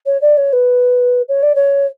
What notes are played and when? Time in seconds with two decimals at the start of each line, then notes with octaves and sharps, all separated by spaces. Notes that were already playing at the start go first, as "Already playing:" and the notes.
0.06 C#5
0.21 D5
0.37 C#5
0.53 B4
1.28 C#5
1.42 D5
1.55 C#5